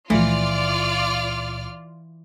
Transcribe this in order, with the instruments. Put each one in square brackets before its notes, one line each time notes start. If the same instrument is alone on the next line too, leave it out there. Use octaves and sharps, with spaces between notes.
[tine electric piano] C#2 A#2 [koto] E3 [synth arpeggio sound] F3 A3 [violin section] F4 D5 F6